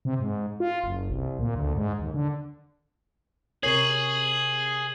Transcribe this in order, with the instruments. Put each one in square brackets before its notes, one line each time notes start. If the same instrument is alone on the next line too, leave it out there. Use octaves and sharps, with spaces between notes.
[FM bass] C3
G#2
F4
F#1
C2
A#2
D2
G#2
D#2
D3
[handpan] C3 A#4 C#5 [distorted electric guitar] G#4 [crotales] G#6 C7 F#7